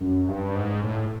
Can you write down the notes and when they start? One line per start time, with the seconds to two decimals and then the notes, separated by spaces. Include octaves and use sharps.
0.01 F#2
0.28 G2
0.55 G#2
0.84 A2